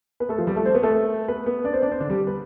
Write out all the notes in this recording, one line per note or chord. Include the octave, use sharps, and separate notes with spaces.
B3 B4
A3 A4
F3 F4
G3 G4
A3 A4
C4 C5
B3 B4
A3 A4
B3 B4
B3 B4
D4 D5
C4 C5
D4 D5
C4 C5
D3 D4
G3 G4
B3 B4